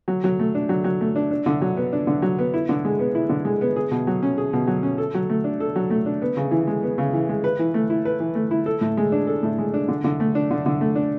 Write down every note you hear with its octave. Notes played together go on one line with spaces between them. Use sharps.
F#3
F#3
A3
D4
F#3
F#3
A3
D4
D4
D3
F#3
B3
D4
D3
F#3
B3
E4
D3
G#3
B3
E4
D3
G#3
B3
G#4
B2
F#3
C#4
G#4
B2
F#3
C#4
A4
F#3
A3
D4
A4
F#3
A3
D4
B3
C#3
E3
G#3
B3
C#3
E3
G#3
B4
E3
A3
E4
B4
E3
A3
E4
A4
A2
G#3
D4
A4
A2
G#3
D4
D3
D3
A3
D4
D3
D3
A3
D4